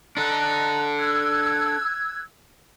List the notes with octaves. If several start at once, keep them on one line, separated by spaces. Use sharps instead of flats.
D4 A4 D#5 A#5 F#6
E6 F#6 G#6